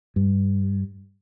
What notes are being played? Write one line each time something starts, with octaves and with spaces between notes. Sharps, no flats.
G2